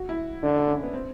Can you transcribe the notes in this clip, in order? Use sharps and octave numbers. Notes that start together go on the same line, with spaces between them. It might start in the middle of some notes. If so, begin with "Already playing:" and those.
Already playing: F#4
E4
D3 D4
D4
C#4
B3
C4